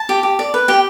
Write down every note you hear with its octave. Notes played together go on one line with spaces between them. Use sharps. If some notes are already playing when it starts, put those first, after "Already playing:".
Already playing: A5
G4
G4
D5
B4
G4 G5